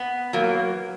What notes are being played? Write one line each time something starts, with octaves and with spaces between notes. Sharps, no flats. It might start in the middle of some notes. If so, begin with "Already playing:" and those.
Already playing: B3
F#3 A#3